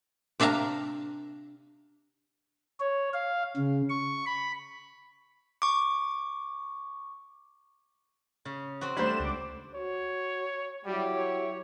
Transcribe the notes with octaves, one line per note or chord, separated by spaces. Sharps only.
C3 D4 E5 F5 A#5
C#5
F5
C#3
C#6
B5
C#6 D6
C#3
C4 F#4
G3 A3 C4 D4 C5 B5 E7
C#2 D6
F#4 C#5
F#3 G3 E4 G4
C#5